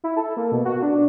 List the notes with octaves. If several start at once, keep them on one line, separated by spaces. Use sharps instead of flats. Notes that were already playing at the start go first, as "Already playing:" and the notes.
E4
A4
A#3
B2
F#4
D4